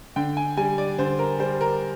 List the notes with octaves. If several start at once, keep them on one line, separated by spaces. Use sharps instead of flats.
D3 G5
G#5
G3 G#5
D5
D3 C5
A#4
G3 C5
A#4